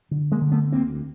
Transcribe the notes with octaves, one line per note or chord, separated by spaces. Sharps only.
D3
G#3 A#3
D3
A3 B3
D2 A#3 C4